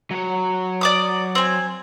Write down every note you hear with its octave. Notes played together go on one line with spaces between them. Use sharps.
F#3 C#5
D5 D6 D#6
C4 G#5